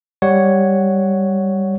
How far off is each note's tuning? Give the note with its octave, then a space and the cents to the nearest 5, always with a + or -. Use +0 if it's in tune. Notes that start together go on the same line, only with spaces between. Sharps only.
G3 +0 C#5 +0 F#5 +0